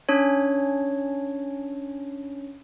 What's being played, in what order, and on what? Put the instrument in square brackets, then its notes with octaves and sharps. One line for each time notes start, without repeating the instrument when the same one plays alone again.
[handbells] C#4 D4 C#5